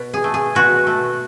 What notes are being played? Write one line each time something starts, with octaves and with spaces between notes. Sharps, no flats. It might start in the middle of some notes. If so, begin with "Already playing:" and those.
Already playing: B2
G#4
A3
G#4
B2 F#4
A3